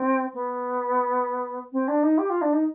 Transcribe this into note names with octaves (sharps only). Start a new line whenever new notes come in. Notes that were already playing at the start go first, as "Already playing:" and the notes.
Already playing: C4
B3
C4
D4
D#4
G4
F4
D4
D#4